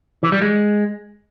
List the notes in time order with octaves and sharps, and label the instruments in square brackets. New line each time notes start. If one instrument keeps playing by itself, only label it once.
[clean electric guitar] E3
G3
G#3